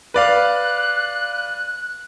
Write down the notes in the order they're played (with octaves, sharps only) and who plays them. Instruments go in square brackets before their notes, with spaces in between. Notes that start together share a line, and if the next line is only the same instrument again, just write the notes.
[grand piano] B4 D5 F5 [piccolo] F#6